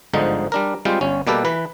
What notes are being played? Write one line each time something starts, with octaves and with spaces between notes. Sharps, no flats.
G1 G#2 D3 F3 D#4
G3 D4 A#4
G3 G#3 C4 F4 C5
G1 C#4
B2 G3 A#3 G4 A4 B4
E3 B4